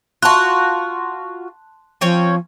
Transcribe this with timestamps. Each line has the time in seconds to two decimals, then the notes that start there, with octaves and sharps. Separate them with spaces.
0.22 F4 F#4 A5 C6 F#6
2.01 F3 C4 C#4 C#5